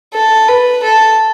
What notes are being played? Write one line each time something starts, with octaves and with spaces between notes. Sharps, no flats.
A4
B4
A4